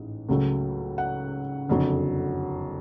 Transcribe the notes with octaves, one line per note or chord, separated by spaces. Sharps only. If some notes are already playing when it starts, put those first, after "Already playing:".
Already playing: A1 G#2
C#2 C#3 F#3 A3
F#5
F#1 F2 D3 F#3